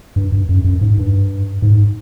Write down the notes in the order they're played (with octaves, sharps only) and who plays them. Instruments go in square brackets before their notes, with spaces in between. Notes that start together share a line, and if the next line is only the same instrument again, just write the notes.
[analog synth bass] G2
G2
F#2
F#2
G#2
G2
G#2